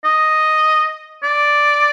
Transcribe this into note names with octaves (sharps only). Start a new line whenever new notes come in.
D#5
D5